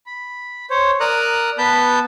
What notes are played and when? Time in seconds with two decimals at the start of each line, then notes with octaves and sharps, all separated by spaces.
0.06 B5
0.70 C5 C#5
1.00 A#4 D5 A#5 D#6 F#6
1.58 B3 B4 A5 B5 G6